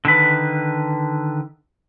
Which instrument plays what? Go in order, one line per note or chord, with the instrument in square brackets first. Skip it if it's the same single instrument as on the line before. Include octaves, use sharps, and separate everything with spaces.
[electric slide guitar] D3 D#3 B4